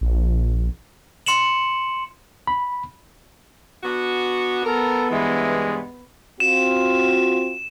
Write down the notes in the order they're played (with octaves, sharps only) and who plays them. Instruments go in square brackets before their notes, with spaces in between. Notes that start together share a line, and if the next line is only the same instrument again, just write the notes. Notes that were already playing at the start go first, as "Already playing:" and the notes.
[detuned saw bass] A#1
[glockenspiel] C6 C#7 E7 F#7
[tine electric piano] B5
[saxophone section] B3 D4 F#4
[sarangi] B3 [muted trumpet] A4 [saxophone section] A#4
[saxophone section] G2 C3 E3 [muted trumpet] G#3
[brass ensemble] C4 F4 F#4 [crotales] E7